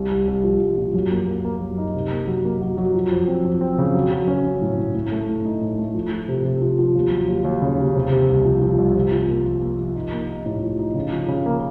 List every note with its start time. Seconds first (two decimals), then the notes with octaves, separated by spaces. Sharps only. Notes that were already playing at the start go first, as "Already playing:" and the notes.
Already playing: C2
0.11 C2
0.27 C2
0.44 F3
0.60 C2
0.78 A#2
0.94 F#2
1.11 A#3
1.27 A#3
1.45 A#3
1.61 F#2
1.78 D#4
1.95 C3
2.11 A#3
2.27 F#3
2.45 A#3
2.61 F#3
2.77 F#3
2.94 F3
3.11 F2
3.28 C4
3.44 F2
3.61 C4
3.78 C#3
3.94 F#3
4.11 F#3
4.28 C#4
4.44 F#3
4.62 A2
4.78 A2
4.94 A2
5.11 A3
5.29 A2
5.45 D#4
5.61 A2
5.78 A3
5.95 F3
6.12 F3
6.28 C3
6.44 C3
6.62 F3
6.79 F3
6.95 D#2
7.11 F#3
7.28 D#2
7.44 D#2
7.62 C#3
7.79 D#2
7.95 C3
8.12 C3
8.29 C2
8.45 F3
8.62 F3
8.78 C2
8.95 C3
9.12 F3
9.29 A#3
9.46 F4
9.62 A#3
9.79 F3
9.95 D#4
10.13 A#3
10.28 D#4
10.46 A2
10.61 F3
10.79 D#4
10.95 C#3
11.12 F3
11.28 C#3
11.46 A#3